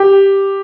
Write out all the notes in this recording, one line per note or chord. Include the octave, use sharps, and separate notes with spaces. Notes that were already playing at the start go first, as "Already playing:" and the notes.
Already playing: G4